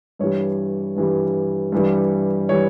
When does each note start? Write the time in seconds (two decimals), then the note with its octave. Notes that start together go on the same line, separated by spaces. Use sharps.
0.19 G2 E3 G3 C#5
0.96 G2 E3 G3
1.72 G2 E3 G3
2.49 E3 G3 C#5